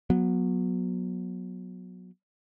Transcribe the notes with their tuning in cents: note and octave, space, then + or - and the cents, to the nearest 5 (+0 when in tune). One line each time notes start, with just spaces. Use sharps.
F#3 -20 B3 -20